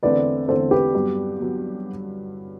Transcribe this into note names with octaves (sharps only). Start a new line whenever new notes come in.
E2 D3 A3 C4 B4 D5
E2 D3 A3 C4 A4 C5
G4 B4
G2 F#3 B3
F#3 B3